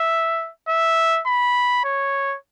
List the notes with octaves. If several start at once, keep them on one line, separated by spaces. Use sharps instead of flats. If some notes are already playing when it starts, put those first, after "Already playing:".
Already playing: E5
E5
B5
C#5